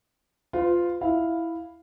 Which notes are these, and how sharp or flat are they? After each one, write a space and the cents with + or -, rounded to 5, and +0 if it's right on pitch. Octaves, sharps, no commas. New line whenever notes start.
F4 +0 B4 +45
E4 +0 F5 +0